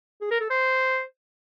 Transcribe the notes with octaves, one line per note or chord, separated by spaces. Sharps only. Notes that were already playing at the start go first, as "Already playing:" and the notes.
G#4
A#4
A4
C5